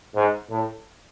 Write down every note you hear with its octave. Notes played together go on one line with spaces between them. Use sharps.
G#2
A2